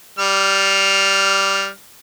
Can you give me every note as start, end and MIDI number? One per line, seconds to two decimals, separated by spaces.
0.19 1.69 55
0.19 1.69 89